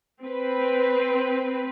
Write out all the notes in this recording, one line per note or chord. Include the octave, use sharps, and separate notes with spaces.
C4 B4